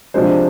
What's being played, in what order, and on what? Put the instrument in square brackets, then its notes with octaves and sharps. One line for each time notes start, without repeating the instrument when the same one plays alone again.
[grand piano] C3 F3 G#3 D4 C5